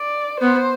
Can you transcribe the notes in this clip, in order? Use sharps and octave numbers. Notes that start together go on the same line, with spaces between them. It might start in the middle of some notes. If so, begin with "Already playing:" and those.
Already playing: D5
B3 C5